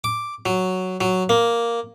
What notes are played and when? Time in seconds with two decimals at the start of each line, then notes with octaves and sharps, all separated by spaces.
0.04 D6
0.46 F#3
1.01 F#3
1.29 A#3